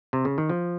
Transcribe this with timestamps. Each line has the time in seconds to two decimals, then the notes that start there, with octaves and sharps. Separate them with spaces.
0.13 C3
0.25 C#3
0.38 D#3
0.50 F3